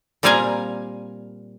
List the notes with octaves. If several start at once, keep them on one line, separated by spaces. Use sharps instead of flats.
A#2 G3 C4 F5 G#5 A#5